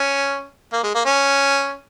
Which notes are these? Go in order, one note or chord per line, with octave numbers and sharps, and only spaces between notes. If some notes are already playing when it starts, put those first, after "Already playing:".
Already playing: C#4
A#3
G#3
A#3
C#4